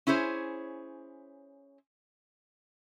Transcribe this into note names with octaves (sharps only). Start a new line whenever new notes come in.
C#4 E4 G#4 C5 C#5